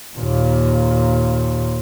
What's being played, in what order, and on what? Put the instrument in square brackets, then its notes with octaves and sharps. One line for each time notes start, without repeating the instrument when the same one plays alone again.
[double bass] D#2 A#2